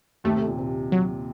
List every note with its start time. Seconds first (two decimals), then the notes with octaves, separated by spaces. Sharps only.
0.24 D#2 D#3 A3
0.36 C3
0.47 A#2
0.59 C3
0.92 F#3